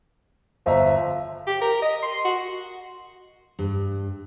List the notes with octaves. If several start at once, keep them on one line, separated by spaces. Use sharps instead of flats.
G1 F3 E5 A#5
G4
A#4
D#5
C6
F#4
G2